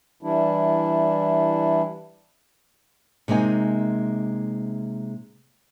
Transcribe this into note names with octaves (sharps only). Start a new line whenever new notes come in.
E3 G3 D4 E4
C3 G#3 A#3 D#4 G#5